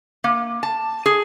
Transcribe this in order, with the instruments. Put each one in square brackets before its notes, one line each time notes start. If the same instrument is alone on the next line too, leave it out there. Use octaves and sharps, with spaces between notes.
[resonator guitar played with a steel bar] A#3
A5
G#4